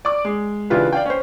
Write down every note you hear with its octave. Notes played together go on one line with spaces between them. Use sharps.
D5 D6
G#3
C#3 E3 D4 F4 G4 B4
D5 F5 G5
C#4 C5